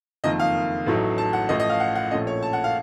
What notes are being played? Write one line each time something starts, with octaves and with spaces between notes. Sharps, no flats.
F#1 F2 D#3 A#3 D#4 D#5
F5
A1 A2 F#3 A3 D#4
A5
F#5
A1 A2 F3 A3 D#5
D#5
F5
F#5
F#5
A#1 A#2 A3 C#4 D#5
C#5
A5
F#5
F5